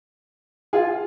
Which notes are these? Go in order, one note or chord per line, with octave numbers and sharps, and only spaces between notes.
F4 G#4